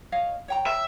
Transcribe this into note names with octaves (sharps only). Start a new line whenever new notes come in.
C#5 D#5 F5
C#5 G5 A#5
E5